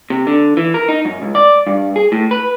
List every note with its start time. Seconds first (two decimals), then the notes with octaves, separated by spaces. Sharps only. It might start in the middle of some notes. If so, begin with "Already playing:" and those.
0.10 C3
0.27 D3
0.57 E3
0.74 A#4
0.88 D#4
1.05 F#2
1.22 C#2
1.35 D5
1.67 G2
1.96 G#4
2.12 A2
2.31 B4